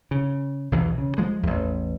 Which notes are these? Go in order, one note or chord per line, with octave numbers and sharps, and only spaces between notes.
C#3
B1 E2 E3
C#3
F3 G#3
A1 E2